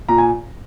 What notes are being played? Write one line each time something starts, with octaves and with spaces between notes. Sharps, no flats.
A#2 A#5
G#5